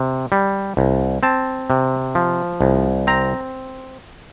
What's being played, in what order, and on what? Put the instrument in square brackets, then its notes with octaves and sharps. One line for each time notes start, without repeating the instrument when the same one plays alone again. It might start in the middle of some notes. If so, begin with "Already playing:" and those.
Already playing: [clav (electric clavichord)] C3
G3
C2
C4 A5
C3
F3
C2
C4 A#5